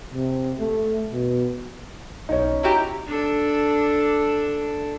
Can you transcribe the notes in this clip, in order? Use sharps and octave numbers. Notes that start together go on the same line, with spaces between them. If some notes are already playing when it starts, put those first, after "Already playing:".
C3
A3
B2
B1 C#4 D#4
E4 F#4 G4 A#5
D4 A4